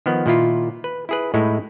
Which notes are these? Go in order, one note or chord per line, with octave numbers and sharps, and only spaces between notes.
D#3 F3 B3
A#2 D#3 E4 F4
B4
E4 G#4 B4
A2 G#3 D#4 E4